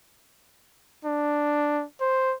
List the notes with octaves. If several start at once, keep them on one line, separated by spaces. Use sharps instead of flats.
D4
C5